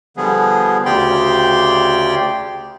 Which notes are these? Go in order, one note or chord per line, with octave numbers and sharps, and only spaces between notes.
D3 F3 G3 B3 G#4
D2 C#3 G4 D5 G5 C6